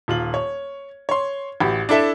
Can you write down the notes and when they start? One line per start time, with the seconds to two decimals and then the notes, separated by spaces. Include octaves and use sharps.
0.08 D#1 F4 F#7
0.34 C#5
1.09 C#5 C6
1.60 A1 F#4 G4 B5
1.89 D4 E4 A4 E5